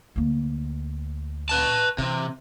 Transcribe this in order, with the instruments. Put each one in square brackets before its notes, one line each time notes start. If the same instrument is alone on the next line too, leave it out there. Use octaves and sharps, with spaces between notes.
[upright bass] D2 A#3
[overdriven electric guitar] B4 A5
[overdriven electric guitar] C3 [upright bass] E3